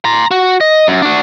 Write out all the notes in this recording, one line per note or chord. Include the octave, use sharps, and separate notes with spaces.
A#5 C6
F#4
D#5
F#2
D4 F#4